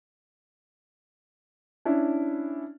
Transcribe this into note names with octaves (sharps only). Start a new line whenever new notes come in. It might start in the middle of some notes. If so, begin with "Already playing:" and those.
C#4 D4 E4